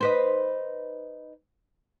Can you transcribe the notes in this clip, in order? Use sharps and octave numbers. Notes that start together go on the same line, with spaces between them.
D#4 B4 C5